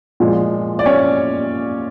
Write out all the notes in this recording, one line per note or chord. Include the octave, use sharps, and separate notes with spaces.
A#2 F3 G#3
D5
C#4 C#5